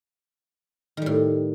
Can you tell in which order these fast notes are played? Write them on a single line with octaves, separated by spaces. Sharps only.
D#3 G3 A2